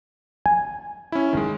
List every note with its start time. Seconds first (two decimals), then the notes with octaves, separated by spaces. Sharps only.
0.46 G#5
1.12 C#4 E4
1.33 D#3 G#3